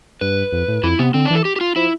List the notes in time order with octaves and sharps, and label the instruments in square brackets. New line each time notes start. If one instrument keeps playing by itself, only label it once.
[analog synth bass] G2 [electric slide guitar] B4
[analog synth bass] F2
A2
[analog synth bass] F2 [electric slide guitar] E4
[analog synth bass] C3 [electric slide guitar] B3
[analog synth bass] D3 [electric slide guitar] C4
[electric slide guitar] D4
[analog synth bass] E3
[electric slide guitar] A4
G4
G4
F4
[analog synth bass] F3 [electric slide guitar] E4